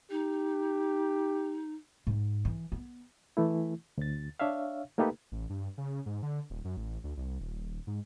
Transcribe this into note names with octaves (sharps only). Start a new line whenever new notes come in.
D#4 G4
G#2
E3
B3
E3 A3 E4
D2 A6
D4 C#5 E5 F5
A3 A#3 D#4 G4 A4 B4
A1
G2
C#3
G#2
D3
D#1
F#2
A1
D2
C2
D#1
G#2